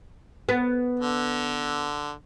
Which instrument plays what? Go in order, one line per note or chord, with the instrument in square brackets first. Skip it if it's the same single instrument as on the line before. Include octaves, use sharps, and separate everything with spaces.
[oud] B3
[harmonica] D3